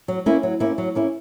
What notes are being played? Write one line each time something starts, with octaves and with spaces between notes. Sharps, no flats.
F#3
A#3 C#4 E4
F#3
A#3 C#4 E4
F#3
A#3 C#4 E4